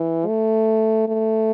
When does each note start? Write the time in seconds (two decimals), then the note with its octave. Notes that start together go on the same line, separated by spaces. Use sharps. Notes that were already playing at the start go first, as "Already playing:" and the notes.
Already playing: E3
0.27 A3
1.08 A3